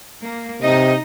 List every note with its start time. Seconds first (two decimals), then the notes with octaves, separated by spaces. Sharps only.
0.22 A#3
0.62 C3 D#4 D#5